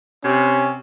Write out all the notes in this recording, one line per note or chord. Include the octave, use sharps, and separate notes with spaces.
C3 C#4